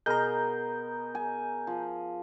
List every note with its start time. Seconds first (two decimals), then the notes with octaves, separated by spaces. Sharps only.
0.06 B2 G#4 A#4 A#5 G6
1.15 G#5
1.67 F3